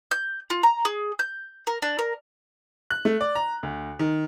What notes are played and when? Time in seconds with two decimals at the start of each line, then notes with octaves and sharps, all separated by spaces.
0.11 G6
0.50 F4
0.63 A#5
0.85 G#4
1.19 G6
1.67 A#4
1.82 D4
1.99 A#4
2.90 F#6
3.05 A3
3.21 D5
3.35 A#5
3.63 D2
3.99 D#3